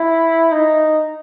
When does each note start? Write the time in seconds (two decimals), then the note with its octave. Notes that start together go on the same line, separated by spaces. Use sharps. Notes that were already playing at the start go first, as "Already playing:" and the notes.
Already playing: E4
0.52 D#4